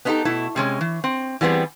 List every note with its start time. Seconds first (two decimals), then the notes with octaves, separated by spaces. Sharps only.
0.05 B3 C#4 D#4 E4 G4 A4
0.25 B2 A3 E4
0.56 C3 G#3 C#4
0.81 E3
1.04 C4
1.41 E3 G3 B3 C4 G#4